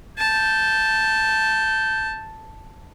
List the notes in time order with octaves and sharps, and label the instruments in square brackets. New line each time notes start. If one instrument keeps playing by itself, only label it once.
[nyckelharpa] A5 [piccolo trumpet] G6